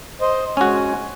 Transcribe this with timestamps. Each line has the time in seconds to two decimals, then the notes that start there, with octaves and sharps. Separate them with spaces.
0.21 C5 D#5
0.57 G#3 C#4 F#4 G#5